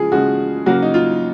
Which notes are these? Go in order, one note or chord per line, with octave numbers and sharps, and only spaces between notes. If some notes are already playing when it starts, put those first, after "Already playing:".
Already playing: C#3 F3 G#3 G#4
C#3 F3 G#3 F#4
C#3 F#3 A#3 F#4
D#4
F4